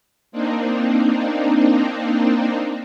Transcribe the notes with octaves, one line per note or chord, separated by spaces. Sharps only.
A#3 C4 D4 D#4